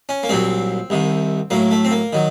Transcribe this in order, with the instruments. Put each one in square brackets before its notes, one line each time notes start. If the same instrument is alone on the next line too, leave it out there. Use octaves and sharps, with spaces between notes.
[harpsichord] C#4
A#3
C2 A#2 F#3 C4
C2 C3 D#3
A2 F#3 A#3
A3
C4
A#3
D#3 F#3